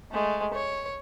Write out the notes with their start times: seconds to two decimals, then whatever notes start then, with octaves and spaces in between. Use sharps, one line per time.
0.11 G#3 A3
0.54 C#5